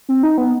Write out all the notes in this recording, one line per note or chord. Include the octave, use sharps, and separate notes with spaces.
C4
D#4
B3